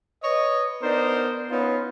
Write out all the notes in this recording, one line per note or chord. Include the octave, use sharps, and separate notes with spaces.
B4 C#5 D#5
B3 D4 D#4 A#4 C5
B3 C#4 D#4 F4 B4